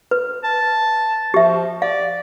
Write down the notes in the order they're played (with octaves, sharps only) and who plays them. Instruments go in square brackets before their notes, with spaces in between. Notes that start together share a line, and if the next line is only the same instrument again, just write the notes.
[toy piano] B4
[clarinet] A5
[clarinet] F3 [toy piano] G4 E5
[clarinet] D5 [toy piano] F5